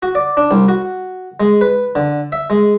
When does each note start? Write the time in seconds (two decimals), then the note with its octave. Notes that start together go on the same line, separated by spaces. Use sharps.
0.03 F#4
0.15 D5
0.37 D4
0.51 C2
0.68 F#4
1.40 G#3
1.61 B4
1.95 D3
2.32 E5
2.50 G#3